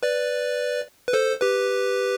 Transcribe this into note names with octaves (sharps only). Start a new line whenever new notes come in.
B4 D5
B4
A4 C5
G4 B4